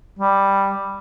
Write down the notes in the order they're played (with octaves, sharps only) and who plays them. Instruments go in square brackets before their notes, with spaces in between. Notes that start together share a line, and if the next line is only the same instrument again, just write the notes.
[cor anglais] G3